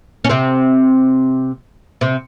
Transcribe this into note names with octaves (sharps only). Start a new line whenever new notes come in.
C#4
C3 C4
C3 C4